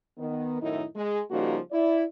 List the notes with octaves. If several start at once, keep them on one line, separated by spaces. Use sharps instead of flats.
D#3 B3
F#2 A2 D#3 D#4 E4
G#3
C#3 F3 G3 A#3 D#4 F#4
E4 D5